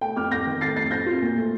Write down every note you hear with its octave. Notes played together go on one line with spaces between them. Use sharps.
A3 G5
F2 D6 F6
F2 G6 A#6
D#3
A3 A6 C7
F2 A6 C7
C4 G6 A#6
F4
A#2
A3